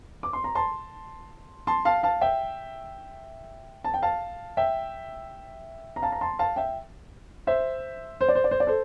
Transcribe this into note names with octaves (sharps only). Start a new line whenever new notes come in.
D6
C6
A#5
A5 C6
A5 C6
F5 A5
F5 A5
E5 G5
A5
G5
F5 A5
E5 G5
A#5
F5 A5
A#5
A5 C6
F5 A5
E5 G5
C5 E5
C5
D5
C5
D5
C5
D5
A4 C5